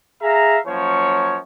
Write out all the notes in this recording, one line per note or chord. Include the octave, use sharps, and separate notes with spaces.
G#4 E5 F5 A#5
F#2 F3 A#3 C#5